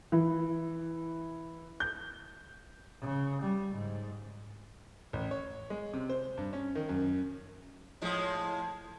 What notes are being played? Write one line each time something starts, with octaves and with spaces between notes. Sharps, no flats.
E3
G6
C#3
G3
G#2
A1
C#5
G#3
C3
C5
G2
C#4
D#3
F#2
A2 F3 G#3